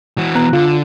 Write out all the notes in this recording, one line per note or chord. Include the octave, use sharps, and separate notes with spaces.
E3 F#4
B3 A#5 F#6
D3 F4